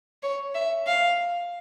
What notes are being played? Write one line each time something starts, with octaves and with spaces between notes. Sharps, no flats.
C#5
E5
F5